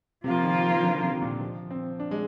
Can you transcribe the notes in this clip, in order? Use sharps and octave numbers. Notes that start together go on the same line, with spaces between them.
C3 F3 A#3 F4
D#3
D3
C3
A#2
F3
C4
D4
G#3